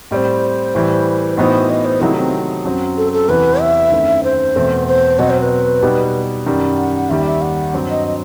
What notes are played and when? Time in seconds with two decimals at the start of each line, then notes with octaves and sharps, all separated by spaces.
0.11 A2 G3 C4 C5 D#5
0.75 A2 E3 G3
1.37 A2 E3 B3 D#4 F#4 C5 D#5
1.70 D#5
1.85 C5
2.01 C3 D#3 F#3 A3 D#4 E4
2.17 C4
2.64 F#2 F#3 C4 F#4
2.97 A4
3.13 A4
3.28 E2 C3 E3 B4
3.61 E5
3.92 F#2 D#3 A3 C4
4.24 C5
4.55 E2 B2 A3 C4
4.87 C5
5.19 B2 F#3 C4 F#4 D#5
5.30 C5
5.40 B4
5.83 B2 G3 D#4 G4
6.46 F#2 D#3 G3
6.78 F#5
7.10 D#2 D#3 G3 E5
7.26 E5
7.42 F#5
7.73 G2 F#3 C4
7.90 D#5
8.06 D#5